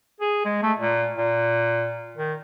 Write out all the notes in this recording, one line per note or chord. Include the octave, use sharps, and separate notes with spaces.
G#4
G#3
A3
A#2
A#2
D#3